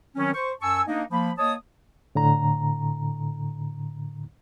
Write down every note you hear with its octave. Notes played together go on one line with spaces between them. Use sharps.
D#3 F#3 C4 C#4
C5 C#6
F#2 G#5 A5 C#6 E6
A#3 D4 D#4
F3 A#3 B5
A#3 C#5 D#5 A5 D#6
A2 D3 A#5